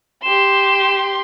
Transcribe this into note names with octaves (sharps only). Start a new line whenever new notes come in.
G4 C6 E7